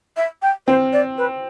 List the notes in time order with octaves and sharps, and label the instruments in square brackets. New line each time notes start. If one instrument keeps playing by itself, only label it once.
[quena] E5
G5
[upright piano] C4 [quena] C5
[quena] D5
B4